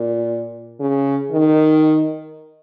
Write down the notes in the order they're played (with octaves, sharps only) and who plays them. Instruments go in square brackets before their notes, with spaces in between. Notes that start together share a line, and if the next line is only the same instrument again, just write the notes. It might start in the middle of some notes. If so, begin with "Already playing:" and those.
Already playing: [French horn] A#2
C#3
D#3